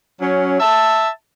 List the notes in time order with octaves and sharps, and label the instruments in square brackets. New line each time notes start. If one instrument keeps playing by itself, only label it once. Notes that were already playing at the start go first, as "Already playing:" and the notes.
[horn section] F#3 C#4
E5 A5